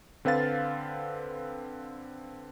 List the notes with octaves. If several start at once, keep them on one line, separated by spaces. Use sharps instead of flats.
D3 C4 B4 F5 A6